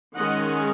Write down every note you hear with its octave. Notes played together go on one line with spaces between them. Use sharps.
D#3 G#3 C#4 D#5 F#5